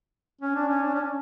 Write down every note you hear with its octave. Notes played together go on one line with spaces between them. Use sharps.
C#4
D4
C#4
D4
C#4